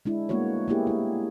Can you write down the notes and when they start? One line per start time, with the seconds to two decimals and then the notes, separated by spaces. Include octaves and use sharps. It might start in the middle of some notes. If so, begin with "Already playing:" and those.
0.05 G#3 D4 E4
0.29 G3 G#3 A#3 B3 F#4 C#5
0.68 A#3 B3 E4 G4 G#4
0.87 A3 E4